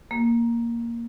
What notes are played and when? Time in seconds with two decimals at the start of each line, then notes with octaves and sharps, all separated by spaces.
0.11 A#3